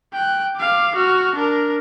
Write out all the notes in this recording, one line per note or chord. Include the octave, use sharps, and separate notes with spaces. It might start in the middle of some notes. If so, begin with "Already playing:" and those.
G5 F#6
F5 D6
F#4 F6
D4 A#4